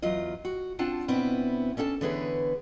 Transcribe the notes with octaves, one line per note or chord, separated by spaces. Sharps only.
E2 F#3 F4 D#5
F#4
C4 D4 F4 F#5 A5
B2 B3 C4 D4 E4
C#4 D4 A4 F#5 A5
D3 E3 B3 G#4 B4 C#5